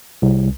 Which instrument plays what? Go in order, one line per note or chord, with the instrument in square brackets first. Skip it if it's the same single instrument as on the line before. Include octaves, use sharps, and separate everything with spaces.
[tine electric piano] C2